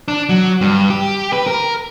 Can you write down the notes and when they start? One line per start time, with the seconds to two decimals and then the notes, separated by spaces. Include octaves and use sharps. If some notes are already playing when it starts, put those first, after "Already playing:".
0.08 D4
0.29 F#3
0.61 G2
0.90 G4
1.33 B4
1.47 A#4